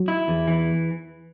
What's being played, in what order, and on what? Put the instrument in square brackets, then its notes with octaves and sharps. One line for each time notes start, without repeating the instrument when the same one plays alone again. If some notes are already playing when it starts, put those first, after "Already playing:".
Already playing: [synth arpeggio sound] F#3 F#4
[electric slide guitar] E4
E2
E3